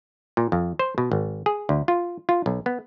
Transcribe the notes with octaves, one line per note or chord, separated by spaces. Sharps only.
A#2
F2
C5
B2
G#1
G#4
D2
F4
F4
B1
B3